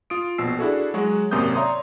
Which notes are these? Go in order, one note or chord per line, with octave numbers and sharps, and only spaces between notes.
F4 D#6 D7
A#1 B2 E6 C7
D4 E4 F#4 G#4 A4
F#3 G#3 F#4
G#1 F#2 C3 A#3 D#6 G6
C#5 D5 E5 A#5 C6 D#6